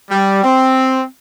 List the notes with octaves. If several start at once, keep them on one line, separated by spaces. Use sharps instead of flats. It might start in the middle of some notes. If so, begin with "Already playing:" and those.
G3
C4